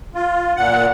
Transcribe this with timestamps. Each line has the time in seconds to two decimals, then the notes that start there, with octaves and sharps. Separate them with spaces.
0.14 F4
0.56 A#2 F#5